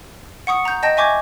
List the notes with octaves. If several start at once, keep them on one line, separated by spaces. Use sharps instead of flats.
F#5 C#6 D#6 C#7
A#5 G6
D#5 G5 A5 G6 A#6
E5 G#5 C#6 D6 G6 G#6